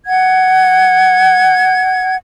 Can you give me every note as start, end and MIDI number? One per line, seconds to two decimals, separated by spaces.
0.06 2.16 78
0.06 2.16 92